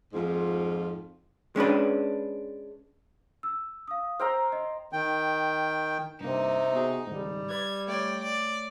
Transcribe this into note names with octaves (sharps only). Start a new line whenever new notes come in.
F2 G#2 F4
G#3 C#4 D4 B4
E6
F5 D#6
C5 G5 A#5 E6 F6
D#5
D#3 G5
G2 C3 A#3 D#4
B3 F#4 G#4
G#1 C#2 G#2 G3
B4 D5 G#6
A3 C#5 D5 G5
D5